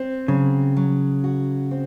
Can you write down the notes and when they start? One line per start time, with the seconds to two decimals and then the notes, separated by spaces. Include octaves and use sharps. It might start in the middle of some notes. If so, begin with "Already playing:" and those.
Already playing: C4
0.28 C#3 F#3
0.77 F#3
1.24 F#4
1.71 C4